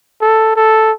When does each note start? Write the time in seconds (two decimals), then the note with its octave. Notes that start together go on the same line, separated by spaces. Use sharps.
0.21 A4
0.56 A4